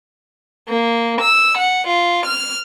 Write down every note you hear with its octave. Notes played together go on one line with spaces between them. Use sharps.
A#3
E6
F#5
F4
F6